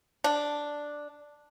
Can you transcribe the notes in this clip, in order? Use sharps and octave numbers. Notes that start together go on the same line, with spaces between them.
D4